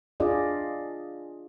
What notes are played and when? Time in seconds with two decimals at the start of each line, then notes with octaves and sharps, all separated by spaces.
0.20 D4 F4 G#4 D5 D#5